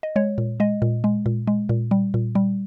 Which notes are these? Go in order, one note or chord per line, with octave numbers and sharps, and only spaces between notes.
D#5
G#3 C#5
A#2
G#3 D#5
A#2
G#3
A#2
G#3
A#2
G3
A#2
G3